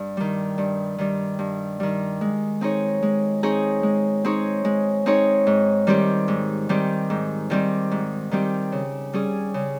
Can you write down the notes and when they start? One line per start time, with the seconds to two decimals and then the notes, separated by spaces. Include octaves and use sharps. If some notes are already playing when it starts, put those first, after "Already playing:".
Already playing: G2
0.17 D#3 G3
0.58 G2
0.98 D#3 G3
1.39 G2
1.80 D#3 G3
2.21 G#3
2.61 C4 D#4 G#4 C#5
3.03 G#3
3.43 C4 D#4 G#4 C#5
3.83 G#3
4.24 C4 D#4 G#4 C#5
4.65 G#3
5.06 C4 D#4 G#4 C#5
5.47 G#2
5.87 D#3 G3 C4 G4
6.28 G#2
6.69 D#3 G3 C4 G4
7.10 G#2
7.50 D#3 G3 C4 G4
7.91 G#2
8.31 D#3 G3 C4 G4
8.72 C#3
9.13 G3 C#4 G#4
9.54 C#3